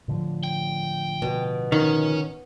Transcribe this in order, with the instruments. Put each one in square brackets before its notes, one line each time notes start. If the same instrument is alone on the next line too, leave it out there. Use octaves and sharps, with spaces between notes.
[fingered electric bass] A2 D3 F3
[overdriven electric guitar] G5
[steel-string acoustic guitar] B2
[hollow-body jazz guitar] D#3 [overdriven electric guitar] C#4